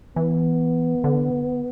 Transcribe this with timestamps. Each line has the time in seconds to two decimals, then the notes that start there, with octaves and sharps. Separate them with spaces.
0.16 E3 B3
1.04 D3